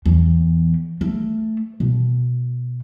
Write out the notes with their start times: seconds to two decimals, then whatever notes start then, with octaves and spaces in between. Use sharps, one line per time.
0.06 E2
1.01 A3
1.80 B2